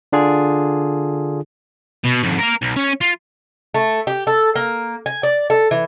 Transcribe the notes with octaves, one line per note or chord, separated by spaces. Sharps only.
D3 D4 F4 G#4
B2
F2 G#2
A#4 F5
B1
C#4
F4
A3
G4
A4
A#3
G#5
D5
A4
E3